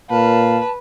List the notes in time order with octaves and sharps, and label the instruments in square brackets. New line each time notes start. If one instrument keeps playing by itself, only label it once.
[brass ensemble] A#2 F5 [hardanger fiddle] B4 [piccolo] A5